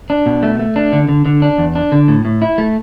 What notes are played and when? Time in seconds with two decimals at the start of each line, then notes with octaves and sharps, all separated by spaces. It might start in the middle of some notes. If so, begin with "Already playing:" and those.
0.10 D4
0.26 B2
0.43 A3
0.59 A3
0.76 D4
0.92 D3
1.09 D3
1.26 D3
1.42 D4
1.58 E2
1.75 D4
1.92 D3
2.08 A2
2.25 A2
2.42 E4
2.58 A3